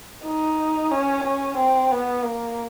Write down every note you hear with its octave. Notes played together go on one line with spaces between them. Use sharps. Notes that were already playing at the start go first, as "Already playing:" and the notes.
D#4
C#4
C#4
C4
B3
A#3